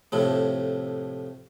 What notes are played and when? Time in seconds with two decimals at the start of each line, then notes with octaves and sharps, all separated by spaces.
0.12 F2 A2 C3 A3